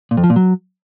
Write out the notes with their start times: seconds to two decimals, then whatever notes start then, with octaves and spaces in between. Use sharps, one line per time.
0.11 A#2
0.17 F2
0.24 F3
0.30 A#2
0.36 F#3